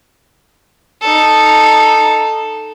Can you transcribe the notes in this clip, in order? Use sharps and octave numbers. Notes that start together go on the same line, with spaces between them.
D#4 A4